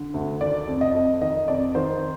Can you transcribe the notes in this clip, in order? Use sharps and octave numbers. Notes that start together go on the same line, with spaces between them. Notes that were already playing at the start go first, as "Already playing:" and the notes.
Already playing: D3
D2
D#3 D5
F2
D#5
F2
D#3 D#5
F2 D5
D#3 C5